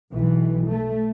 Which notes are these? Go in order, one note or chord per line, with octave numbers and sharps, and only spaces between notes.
B1 E3
A3